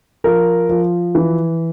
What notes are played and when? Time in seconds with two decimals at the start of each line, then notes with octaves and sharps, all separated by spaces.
0.24 F3 A#4
0.69 F3
1.15 E3